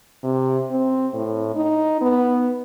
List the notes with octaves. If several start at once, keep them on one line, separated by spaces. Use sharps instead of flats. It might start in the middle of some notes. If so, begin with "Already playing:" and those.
C3
C4
A2
D#4
B3